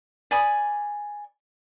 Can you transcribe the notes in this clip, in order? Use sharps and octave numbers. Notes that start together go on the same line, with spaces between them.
D5 G#5 B5 D#6